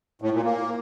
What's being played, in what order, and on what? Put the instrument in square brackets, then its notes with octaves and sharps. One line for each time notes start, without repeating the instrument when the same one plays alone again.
[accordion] A2
A#2
A#3